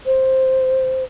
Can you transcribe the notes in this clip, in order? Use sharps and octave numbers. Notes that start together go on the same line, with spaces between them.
C5